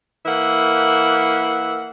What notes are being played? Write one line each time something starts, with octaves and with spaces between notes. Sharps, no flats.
E3 A#3 E5 F#5